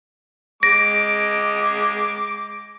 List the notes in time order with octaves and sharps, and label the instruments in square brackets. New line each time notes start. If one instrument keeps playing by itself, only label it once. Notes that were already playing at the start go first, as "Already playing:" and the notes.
[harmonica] G#3 D6 [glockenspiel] A#6 D7